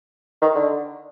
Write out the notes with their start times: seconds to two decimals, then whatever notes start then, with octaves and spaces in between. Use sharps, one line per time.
0.42 D#3
0.55 D3